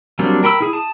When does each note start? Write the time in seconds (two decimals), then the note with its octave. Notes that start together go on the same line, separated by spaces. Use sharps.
0.19 F#3 G3 A#3 C4 D4
0.43 A#4 G5 B5 C6 E6
0.60 E4 G#4
0.73 A5 D#6